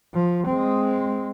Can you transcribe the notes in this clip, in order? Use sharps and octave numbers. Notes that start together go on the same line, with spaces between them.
F3
G#3 C4